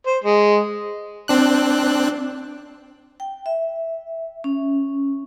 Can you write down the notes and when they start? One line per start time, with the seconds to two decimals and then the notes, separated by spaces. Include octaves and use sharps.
0.06 C5
0.24 G#3
1.28 C4 D4 F#6
3.20 G5
3.46 E5
4.44 C#4